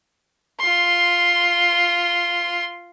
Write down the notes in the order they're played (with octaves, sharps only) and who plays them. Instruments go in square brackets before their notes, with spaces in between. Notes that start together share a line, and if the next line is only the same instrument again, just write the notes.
[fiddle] F4 C6